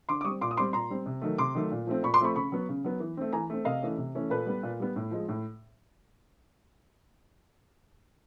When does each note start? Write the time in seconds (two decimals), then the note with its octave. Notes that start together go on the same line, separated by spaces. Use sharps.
0.09 D3 C6 D6
0.21 D6
0.24 G3 C#6 D#6
0.27 C4
0.41 A#2 C6 D6
0.51 D#6
0.57 G3 C4 C6 D6
0.73 A#2 A#5 C6
0.90 G3 C4
1.06 C3
1.22 D#3 F#3 A3
1.38 C3 C6 D6
1.55 D#3 F#3 A3
1.71 A#2
1.87 F3 A3 C4
2.03 A#2 B5 C#6
2.14 C6 D6
2.20 F3 A3 C4 B5 C#6
2.36 C#3 B5 C#6
2.52 F#3 B3
2.69 C#3
2.84 F#3 B3
3.00 E3
3.17 A3 C4
3.33 E3 G#5 A#5
3.50 A3 C4
3.65 C3 D#5 F5
3.82 E3 A3 C#4
3.98 C3
4.15 E3 A3 C#4
4.30 A#2 A4 B4
4.46 G3 B3
4.63 A#2
4.80 G3 B3
4.96 A2
5.11 F3 G#3
5.29 A2